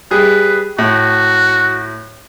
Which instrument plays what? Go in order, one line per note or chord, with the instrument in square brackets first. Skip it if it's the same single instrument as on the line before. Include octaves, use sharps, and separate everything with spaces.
[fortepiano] G3 G#4 [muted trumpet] B4
[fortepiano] A2 [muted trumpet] F#4